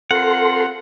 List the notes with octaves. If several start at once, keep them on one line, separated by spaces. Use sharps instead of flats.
C4 F4 A4 A#4 F#5 C6